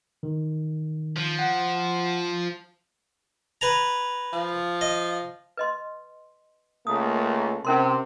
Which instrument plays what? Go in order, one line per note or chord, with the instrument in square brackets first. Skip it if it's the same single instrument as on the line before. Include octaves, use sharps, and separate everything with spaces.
[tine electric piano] D#3
[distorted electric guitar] F3
[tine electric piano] F#5
[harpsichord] B4 G#5 A#5
[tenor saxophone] F3
[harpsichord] D#5
[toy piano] B4 D#5 C6
[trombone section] C#2 A3 A#3 [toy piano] D#6
[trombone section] C3 [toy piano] C#4 A#4 C6